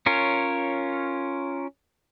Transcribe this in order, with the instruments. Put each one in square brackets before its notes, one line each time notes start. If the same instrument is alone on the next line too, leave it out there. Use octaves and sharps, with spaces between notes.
[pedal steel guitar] C#4 F4 A#4 C#5